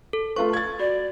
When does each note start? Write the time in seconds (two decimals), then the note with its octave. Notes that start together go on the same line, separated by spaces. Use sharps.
0.13 A4
0.36 A3 F4 B4 C#6
0.53 G#6 A6
0.79 F#4 D5